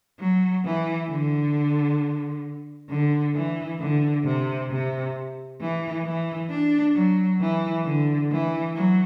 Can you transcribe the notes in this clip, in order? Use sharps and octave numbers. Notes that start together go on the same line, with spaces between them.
F#3
E3
D3
D3
E3
D3
C3
C3
E3
E3
D4
F#3
E3
D3
E3
F#3